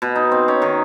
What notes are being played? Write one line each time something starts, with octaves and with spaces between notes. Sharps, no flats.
B2
D#4
C4
C#4
D#3